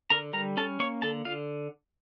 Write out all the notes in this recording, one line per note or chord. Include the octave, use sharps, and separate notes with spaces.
D3 A#4 A#5
G3 A#4 A#5
C#4 A4 A5
A#3 C#5 C#6
D3 A4 A5
D3 F4 F5